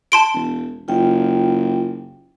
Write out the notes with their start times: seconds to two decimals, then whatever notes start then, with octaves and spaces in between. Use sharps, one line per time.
0.12 A5 C6 D7
0.34 E1
0.88 F#1 F4 G5